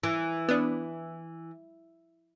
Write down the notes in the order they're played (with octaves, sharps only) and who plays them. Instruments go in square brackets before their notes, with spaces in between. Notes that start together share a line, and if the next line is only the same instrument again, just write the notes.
[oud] E3
[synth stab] B3 D4